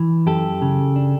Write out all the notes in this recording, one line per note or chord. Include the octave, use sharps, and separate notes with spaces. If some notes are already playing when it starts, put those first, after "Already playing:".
Already playing: E3
F#2 G4 A4
C#3
D4